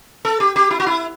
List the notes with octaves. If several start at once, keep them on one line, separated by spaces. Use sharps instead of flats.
A4
G4
G4
E4
F#4
E4